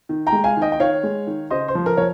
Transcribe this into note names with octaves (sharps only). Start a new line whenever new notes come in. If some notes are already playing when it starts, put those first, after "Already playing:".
D#3
G5 A#5
G#3
F5 G#5
D#3
D#5 G5
G5
D#3 C#5 F5
G#3
D#3
C#3 C5 D#5
C5
F3
A#4
F3 C#5